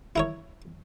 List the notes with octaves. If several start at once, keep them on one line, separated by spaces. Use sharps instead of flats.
E4 A#4 C#5